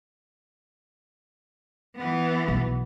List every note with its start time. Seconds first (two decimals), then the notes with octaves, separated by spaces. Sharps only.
1.96 E3 B3
2.48 B1